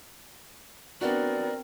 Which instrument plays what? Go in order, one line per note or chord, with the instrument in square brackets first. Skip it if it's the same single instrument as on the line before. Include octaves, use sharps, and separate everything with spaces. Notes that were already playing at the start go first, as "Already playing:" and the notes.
[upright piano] B3 D4 F#4 [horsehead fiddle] C4 A#4 [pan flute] D5